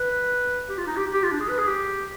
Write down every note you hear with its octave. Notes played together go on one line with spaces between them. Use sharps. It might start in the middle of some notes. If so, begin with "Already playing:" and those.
Already playing: B4
G4
F4
D#4
G4
G4
F4
D4
G#4
B4
G#4
G4